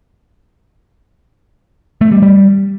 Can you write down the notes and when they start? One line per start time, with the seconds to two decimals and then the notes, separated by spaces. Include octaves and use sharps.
2.01 A3
2.12 G3
2.22 G3